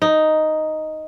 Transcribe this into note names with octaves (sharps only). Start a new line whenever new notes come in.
D#4